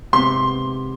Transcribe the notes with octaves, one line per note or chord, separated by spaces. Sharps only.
G#2 C3 B3 C6